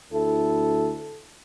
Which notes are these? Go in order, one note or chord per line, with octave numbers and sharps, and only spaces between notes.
D2 E4 A4